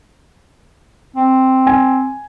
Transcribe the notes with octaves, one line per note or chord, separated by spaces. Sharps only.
C4
G#5